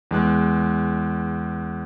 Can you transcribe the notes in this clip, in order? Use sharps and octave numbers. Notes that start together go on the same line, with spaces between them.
E2 G#3 F#6